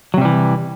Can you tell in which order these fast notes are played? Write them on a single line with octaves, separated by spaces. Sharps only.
F#3 C3 G3 E3